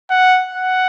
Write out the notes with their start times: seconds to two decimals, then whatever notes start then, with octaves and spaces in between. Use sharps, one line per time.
0.11 F#5
0.55 F#5